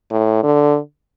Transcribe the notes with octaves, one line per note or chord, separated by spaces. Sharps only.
A2
D3